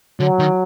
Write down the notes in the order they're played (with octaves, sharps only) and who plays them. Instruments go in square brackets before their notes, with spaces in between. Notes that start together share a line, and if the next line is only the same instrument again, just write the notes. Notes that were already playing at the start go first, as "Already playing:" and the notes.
[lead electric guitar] D3 [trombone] F#3
[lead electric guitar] D#3